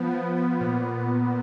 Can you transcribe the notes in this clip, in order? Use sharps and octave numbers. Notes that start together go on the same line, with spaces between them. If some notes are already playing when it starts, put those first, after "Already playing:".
Already playing: F3 B3
F3
B3
A#2